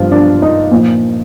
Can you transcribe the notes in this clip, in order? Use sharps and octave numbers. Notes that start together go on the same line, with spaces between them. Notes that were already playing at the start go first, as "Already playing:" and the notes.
Already playing: G2 F3 F4
D4
D#4
A#2 F3